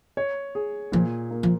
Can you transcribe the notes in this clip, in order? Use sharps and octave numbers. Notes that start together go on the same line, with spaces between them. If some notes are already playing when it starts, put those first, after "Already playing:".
C#5
G#4
A#2 F3
A#3
F3